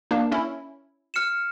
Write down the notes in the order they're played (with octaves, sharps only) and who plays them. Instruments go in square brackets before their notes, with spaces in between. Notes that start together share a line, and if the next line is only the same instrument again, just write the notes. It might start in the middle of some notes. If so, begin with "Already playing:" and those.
[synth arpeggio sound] A#3 D4
C#4 E4
[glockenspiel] F6 C#7 E7